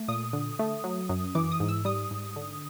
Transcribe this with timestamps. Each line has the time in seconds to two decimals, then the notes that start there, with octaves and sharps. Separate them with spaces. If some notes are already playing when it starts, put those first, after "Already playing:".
Already playing: A3
0.08 A#2 D#6
0.33 D3
0.59 A3
0.84 F#3
1.09 F#2
1.35 E3 D6
1.52 D#6
1.60 G#2
1.69 E6
1.85 G3 D#6
2.11 G#2
2.36 D3